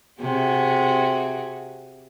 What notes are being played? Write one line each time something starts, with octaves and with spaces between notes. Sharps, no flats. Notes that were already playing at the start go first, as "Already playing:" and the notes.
C3 F#4 G#4